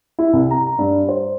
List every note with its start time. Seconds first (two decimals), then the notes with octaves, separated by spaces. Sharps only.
0.19 E4
0.33 C2
0.51 A#5
0.78 G2
1.09 C5